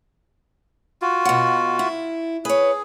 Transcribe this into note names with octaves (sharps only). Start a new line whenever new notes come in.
F4 F#4
B2 F#5
E4
G#4 B4 C#5